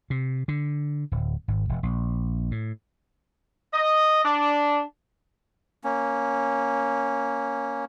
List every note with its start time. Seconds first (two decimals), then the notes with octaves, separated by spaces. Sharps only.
0.10 C3
0.48 D3
1.12 D1
1.48 G#1
1.69 E1
1.83 A#1
2.51 A2
3.74 D#5
4.25 D4
5.84 A#3 C#4